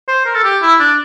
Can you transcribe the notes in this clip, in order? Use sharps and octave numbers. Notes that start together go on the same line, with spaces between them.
C5
A#4
A4
G4
E4
D4